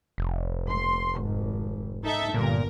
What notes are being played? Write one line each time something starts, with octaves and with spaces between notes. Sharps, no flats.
F1
C6
G#1
D#4 A4 E5
G1 A#2 A#4